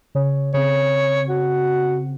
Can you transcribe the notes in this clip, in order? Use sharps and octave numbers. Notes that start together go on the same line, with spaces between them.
C#3 C#5
C#3 C4 C#5
F#4